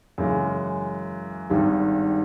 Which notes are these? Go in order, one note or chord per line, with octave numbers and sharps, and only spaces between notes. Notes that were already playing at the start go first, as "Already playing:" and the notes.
F#2 C#3 E3 G#3
G#1 G2 D#3 G3